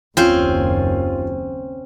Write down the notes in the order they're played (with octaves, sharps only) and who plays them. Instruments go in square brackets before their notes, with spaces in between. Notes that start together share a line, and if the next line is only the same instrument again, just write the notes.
[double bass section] F#1 D#2 [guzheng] C4 C#4 C5 [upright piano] F4